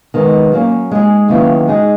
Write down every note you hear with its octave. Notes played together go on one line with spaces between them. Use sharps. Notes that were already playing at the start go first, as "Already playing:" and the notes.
E2 D#3 G#3 B3
F#3 A#3 C#4
G#3 D#4 G#4
D#2 C#3 F#3 B3 E4
G#3 D#4 G#4